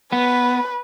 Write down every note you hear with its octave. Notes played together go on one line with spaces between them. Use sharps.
B3 B4